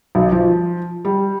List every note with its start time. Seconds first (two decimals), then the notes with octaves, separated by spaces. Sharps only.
0.15 B1
0.32 F3
1.05 G3